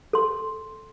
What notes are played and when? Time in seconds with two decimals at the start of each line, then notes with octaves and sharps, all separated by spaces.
0.13 A4 C6